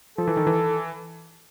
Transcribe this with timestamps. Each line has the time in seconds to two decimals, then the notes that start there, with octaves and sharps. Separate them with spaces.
0.18 F3 A4
0.27 E3
0.37 D#3
0.47 E3